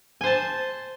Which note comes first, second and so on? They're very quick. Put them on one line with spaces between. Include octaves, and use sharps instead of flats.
G#5 C5 A5